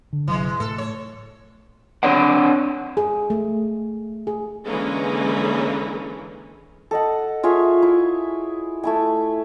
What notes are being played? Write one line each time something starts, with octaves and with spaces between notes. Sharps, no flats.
D3
G1 C3 E3 F#3 G#3
A2 A4
C#5
C4 D4 C#5 D5 F#5
G#4
A3
G#4
D3 E3 G#3 A#3 C#4
A4 D#5 F#5
F4 G#4 C#5 E5
E4
A3 E4 G#5